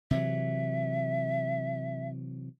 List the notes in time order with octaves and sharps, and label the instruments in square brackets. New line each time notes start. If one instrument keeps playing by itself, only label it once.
[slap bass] C3 E3 F#3 [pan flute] E5